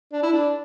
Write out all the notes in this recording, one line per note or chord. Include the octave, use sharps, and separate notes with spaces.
D4
E4
D4